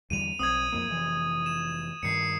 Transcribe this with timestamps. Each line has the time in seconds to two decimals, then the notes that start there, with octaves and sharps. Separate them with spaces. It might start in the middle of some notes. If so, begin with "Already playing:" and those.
0.10 E2 D3 G3 D#7 F7
0.39 B1 C4 D#6 G#6
0.72 F2 A#3
0.88 F1 E3
1.46 E7
2.03 G2 D#3 C7 C#7